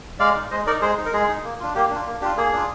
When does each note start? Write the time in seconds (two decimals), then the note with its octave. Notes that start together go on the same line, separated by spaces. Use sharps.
0.20 G#3 D5 F5
0.36 D#4
0.51 G#3 C5 D#5
0.66 D#4 A#4 D5
0.82 G#3 G#4 C5
0.98 D#4
1.05 A#4
1.13 G#3 G#4
1.29 D#4
1.44 A#3
1.60 D4 F4
1.75 A#3 G4
1.90 D4 F4
2.06 A#3
2.21 D4 G4
2.25 F4
2.37 A#3 G#4
2.53 D4 F4